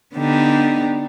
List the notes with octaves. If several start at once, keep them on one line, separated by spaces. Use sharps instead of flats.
D3 B3 D4 D#4 G4